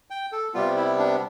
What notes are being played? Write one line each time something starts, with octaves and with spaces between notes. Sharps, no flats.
G5
A4
C3 G3 B3 F4
E4
D4